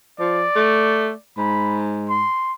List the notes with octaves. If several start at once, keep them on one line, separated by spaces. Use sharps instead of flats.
F3 D5
A3
G#2 B5
C6